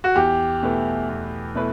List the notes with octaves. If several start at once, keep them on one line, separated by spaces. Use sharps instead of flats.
F#4
E2 G4
B2 A3 E4 B4
E2
B2 A3 E4 B4